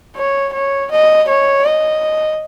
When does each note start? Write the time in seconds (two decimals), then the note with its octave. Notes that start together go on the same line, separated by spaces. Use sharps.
0.16 C#5
0.53 C#5
0.91 D#5
1.28 C#5
1.65 D#5